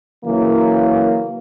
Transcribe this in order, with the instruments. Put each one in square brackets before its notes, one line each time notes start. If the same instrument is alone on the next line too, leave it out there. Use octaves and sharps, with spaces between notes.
[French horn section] C#3 E3 F#3 A#3